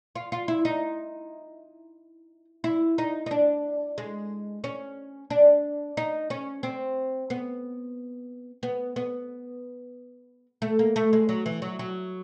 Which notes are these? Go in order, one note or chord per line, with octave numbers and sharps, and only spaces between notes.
F4
F4
E4
D#4
E4
D#4
D#4
D4
G#3
C#4
D4
D#4
C#4
C4
B3
B3
B3
A3
A#3
A3
G#3
F#3
E3
F#3
F#3